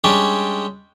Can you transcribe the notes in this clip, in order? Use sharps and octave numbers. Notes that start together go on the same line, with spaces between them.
G3 G#3 C#4 D4 G4